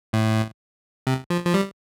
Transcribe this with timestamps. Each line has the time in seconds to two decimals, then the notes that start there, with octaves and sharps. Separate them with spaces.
0.13 A2
1.07 C3
1.30 F3
1.45 F3
1.54 G3